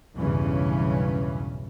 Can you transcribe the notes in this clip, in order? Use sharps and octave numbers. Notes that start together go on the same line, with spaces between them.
B1 E2 G2 C#3 E3 C#4